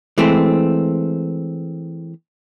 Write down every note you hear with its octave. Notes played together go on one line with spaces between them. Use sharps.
E3 G#3 A3 C4